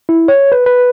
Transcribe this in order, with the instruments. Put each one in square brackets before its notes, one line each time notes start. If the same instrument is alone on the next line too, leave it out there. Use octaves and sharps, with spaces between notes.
[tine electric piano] E4
C#5
B4
B4